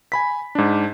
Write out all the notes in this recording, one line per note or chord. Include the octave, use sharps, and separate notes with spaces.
G#5 B5 B6
G#2 D4